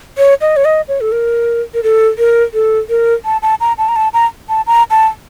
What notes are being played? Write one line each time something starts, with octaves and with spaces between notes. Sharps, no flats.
C#5
D#5
C#5
D#5
C#5
A4
A#4
A#4
A4
A#4
A4
A#4
A5
A5
A#5
A5
A#5
A5
A#5
A5
A#5
A5